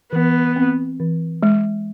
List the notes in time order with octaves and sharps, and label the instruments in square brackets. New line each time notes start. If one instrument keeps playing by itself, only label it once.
[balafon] E3 [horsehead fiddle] B3
[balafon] C4
E3
G#3